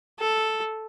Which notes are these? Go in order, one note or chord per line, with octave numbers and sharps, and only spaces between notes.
A4